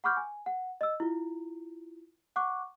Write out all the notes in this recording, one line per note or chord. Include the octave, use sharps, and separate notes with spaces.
F#5 B5 C#6 D6 F6 G6
G#5
F#5
D#5 E6
E4 F4
F#5 C#6 D6 F#6